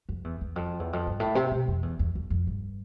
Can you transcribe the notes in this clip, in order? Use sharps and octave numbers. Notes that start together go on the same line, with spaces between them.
F2
E2
E2
F2
E2
F2
G2
A2
C3
B2
F2
E2
E2
F2
F2
G2